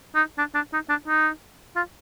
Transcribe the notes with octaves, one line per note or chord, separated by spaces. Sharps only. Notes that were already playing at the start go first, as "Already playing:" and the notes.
D#4
D4
D4
D#4
D4
D#4
F4